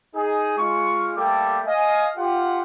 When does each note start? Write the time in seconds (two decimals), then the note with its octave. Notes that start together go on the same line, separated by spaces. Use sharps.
0.15 D#4 G#4
0.58 G#3 F4 C#6
1.16 G3 A3 A#3 A4 G5 D6
1.66 D#5 F5 G#5
2.17 F4 G4 F#5